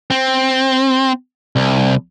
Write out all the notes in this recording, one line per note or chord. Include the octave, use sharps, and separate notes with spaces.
C4
C2